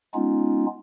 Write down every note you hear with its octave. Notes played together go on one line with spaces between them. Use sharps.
G#3 B3 C#4 D#4 F4